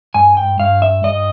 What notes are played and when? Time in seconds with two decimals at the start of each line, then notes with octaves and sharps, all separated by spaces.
0.14 G2 G#5
0.37 G5
0.60 G2 F5
0.82 E5
1.04 G2 D#5